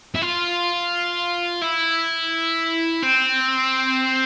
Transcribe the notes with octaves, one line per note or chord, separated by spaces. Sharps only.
E4
F4
E4
C4